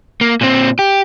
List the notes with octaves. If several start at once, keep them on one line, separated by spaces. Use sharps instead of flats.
A#3
A#2 C4
G4